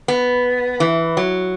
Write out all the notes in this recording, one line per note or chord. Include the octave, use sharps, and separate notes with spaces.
B3
E3
F#3